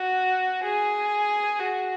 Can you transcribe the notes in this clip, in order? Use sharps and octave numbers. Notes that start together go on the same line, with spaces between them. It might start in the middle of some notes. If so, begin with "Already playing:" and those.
Already playing: F#4
G#4
F#4